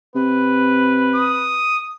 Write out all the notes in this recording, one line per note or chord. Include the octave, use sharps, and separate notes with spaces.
C3 B4
D#6